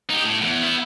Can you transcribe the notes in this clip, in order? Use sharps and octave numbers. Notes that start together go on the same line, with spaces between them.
D#4 G4
A2
E2
B3 E4